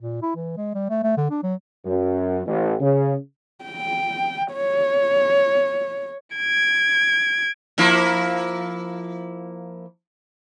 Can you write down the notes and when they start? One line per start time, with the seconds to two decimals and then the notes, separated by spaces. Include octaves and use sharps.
0.01 A#2
0.22 E4
0.35 E3
0.57 G#3
0.74 G3
0.90 A3
1.03 A3
1.17 D3
1.31 D4
1.43 F#3
1.85 F#2
2.46 A1
2.81 C#3
3.64 G5
4.53 C#5
6.36 G#6 D7
7.78 F3 A#3 E4